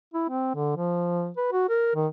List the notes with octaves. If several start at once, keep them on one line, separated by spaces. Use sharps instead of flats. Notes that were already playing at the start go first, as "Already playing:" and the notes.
E4
C4
D3
F3
B4
F#4
A#4
D#3